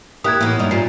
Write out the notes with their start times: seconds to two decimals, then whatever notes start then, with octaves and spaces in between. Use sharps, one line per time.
0.24 A#3 E4 G4 D#6 F#6 G#6
0.41 A2 E3 A#3 B3 E4
0.59 G2 F#3 G3 D#4
0.71 A#2 G3 D#4 C7